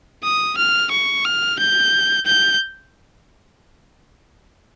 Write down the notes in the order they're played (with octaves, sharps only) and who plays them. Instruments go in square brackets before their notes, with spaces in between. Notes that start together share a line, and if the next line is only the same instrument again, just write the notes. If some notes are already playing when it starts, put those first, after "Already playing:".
[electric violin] D#6
F6
C#6
F6
G6
G6